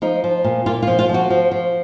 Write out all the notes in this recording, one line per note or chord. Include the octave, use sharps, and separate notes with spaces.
F3 D#4
F3
A#2
A#2 F4
F4
F3
F4
F3 F#4
F3
F3